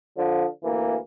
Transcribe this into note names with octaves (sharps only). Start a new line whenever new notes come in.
D3 F3
D2 E3 A#3